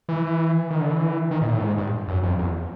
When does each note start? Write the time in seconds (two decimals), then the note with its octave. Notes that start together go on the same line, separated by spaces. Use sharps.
0.09 E3
0.71 D#3
0.81 D3
0.90 E3
1.31 D#3
1.41 A#2
1.51 A2
1.61 G#2
1.78 G2
2.08 F#2
2.23 F2
2.38 E2